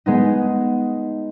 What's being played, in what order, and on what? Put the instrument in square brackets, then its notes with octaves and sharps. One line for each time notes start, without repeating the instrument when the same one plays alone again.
[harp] G#3 B3 D#4